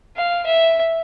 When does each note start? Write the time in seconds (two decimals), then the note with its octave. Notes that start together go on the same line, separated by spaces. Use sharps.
0.16 F5
0.46 E5